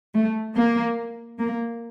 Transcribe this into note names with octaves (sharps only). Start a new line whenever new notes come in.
A3
A#3
A#3